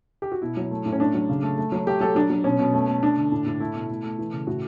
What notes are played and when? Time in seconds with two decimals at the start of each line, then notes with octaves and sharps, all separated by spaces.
0.22 G4
0.32 F#4
0.42 B2 E4
0.57 F#3
0.71 A3
0.86 A2
0.93 C#4
0.99 A3 D4
1.14 F#3
1.29 C#3
1.43 A3
1.58 A3
1.72 F#3
1.87 A3 G4
2.01 F#3 A4
2.15 F#3 D4
2.30 F#3
2.44 B2 C#4
2.59 B2
2.74 A3
2.88 A3
3.02 A3 D4
3.18 D3
3.32 A2
3.46 A2
3.60 A3 E4
3.74 B2
3.90 A3
4.04 A3
4.19 E3
4.33 C#3
4.47 A2 F#4